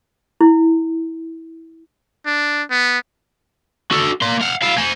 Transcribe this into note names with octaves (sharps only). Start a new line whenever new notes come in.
E4
D4
B3
F#4 A4
A#3 C6
F5 F#5
E4 F5
C5 G#5